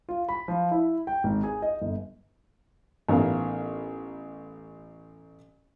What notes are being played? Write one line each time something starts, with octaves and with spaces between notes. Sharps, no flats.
F4
B5
F3
E4
G5
G#1
G#4
D#5
G1
A1 B3 D#4 A#4 F5